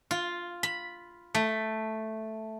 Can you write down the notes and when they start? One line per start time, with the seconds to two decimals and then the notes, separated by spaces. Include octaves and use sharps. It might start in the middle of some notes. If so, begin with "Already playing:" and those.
0.11 F4
0.63 B5
1.35 A3